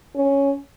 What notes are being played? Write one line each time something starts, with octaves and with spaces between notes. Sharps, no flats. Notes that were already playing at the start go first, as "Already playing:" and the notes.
C#4